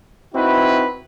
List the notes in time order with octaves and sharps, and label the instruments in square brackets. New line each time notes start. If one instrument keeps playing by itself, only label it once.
[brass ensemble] C4 D#4 E4 F#4 B4